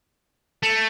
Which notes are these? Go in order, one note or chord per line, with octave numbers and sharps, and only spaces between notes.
A3